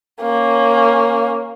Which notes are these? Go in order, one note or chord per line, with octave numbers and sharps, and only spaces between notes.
A#3 C#4